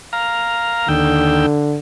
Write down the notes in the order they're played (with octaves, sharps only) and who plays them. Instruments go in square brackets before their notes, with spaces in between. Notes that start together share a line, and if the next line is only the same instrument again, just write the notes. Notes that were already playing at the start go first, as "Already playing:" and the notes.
[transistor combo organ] F5 A#5
[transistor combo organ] D#2 G5 E6 [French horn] D3